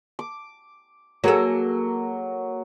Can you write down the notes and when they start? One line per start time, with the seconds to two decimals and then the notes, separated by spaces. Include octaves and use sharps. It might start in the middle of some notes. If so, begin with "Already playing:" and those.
0.19 D6
1.24 F#3 A#3 G#4 A4